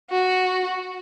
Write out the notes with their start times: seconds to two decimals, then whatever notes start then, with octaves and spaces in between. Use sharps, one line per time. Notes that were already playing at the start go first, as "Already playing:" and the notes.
0.11 F#4